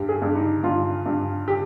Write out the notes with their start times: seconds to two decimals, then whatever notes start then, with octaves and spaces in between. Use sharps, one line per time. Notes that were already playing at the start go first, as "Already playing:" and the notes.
Already playing: G2 G4
0.09 G#4
0.22 G2
0.35 D#4
0.63 G2 F4
1.06 G2
1.48 G4